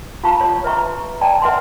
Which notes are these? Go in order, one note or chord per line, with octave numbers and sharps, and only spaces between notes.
F4 F5 A5 A#5 C#6
C#5
B4 E5 A#5 C#6
C#5 D5 G5 A5 A#5
B4 E5 F#5 G#5 C6